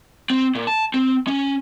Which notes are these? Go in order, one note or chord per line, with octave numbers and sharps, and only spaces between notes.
C4
A#2
A5
C4
C#4